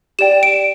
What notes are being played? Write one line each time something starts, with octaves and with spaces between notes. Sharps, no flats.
G4 D5 G5 E7
D7